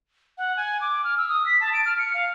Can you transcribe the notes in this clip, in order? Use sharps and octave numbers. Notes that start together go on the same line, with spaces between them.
F#5
G#5
D6
F6
E6
D#6
B6
A5
D7
F6
C#7
F5